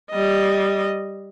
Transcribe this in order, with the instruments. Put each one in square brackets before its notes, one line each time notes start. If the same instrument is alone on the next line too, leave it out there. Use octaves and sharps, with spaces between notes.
[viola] G3 D#5